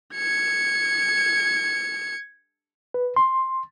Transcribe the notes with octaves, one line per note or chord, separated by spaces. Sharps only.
G#6 C#7
B4
C6